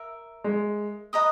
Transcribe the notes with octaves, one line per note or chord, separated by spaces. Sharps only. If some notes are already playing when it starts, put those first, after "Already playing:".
Already playing: A#4 E5
G#3
B4 D#5 A#5 D#6